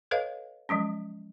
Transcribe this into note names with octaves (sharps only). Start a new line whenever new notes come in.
A4 B4 C#5 D#5 F5
F3 F#3 G#3 C#4